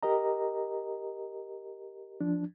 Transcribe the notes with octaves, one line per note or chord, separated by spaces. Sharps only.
G4 A#4 D#5 A#5
F3 D4